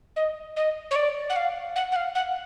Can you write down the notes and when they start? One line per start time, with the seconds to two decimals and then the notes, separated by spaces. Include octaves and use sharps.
0.16 D#5
0.56 D#5
0.91 C#5
0.96 D5
1.30 F#5
1.36 F5
1.76 F#5
1.92 F#5
1.96 F5
2.15 F#5